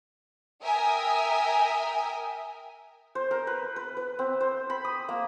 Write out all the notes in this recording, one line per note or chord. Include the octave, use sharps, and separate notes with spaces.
A#4 E5 G5 G#5 D#6
C5
A#4
B4
B4
B4
C4
C5
B5
D#6
A#3